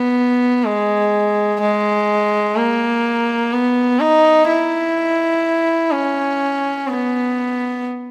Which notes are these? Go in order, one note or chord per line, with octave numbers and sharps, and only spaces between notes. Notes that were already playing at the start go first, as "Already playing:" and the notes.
Already playing: B3
G#3
G#3
A#3
B3
D#4
E4
C#4
B3